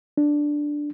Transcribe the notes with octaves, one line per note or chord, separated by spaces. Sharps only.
D4